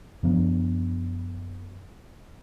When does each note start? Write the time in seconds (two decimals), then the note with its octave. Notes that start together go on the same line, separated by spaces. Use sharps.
0.23 F#2 F3 B3 D4